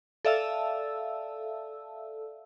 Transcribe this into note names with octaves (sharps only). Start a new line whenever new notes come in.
A4 D5 E5 F5 A5 E6